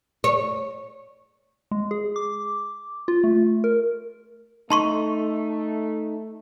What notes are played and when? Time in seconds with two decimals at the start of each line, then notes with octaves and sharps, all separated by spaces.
0.24 C#5
1.71 G#3
1.91 G#4
2.16 D6
3.08 F4
3.24 A3
3.64 A#4
4.70 A3 D#4 A5 C6 C#6